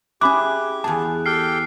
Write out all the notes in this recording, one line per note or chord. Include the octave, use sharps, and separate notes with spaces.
C#4 E4 G4 G#4 B5 D6 F#6
E2 B3 G#4 A5
G4 A4 G5 F6 C7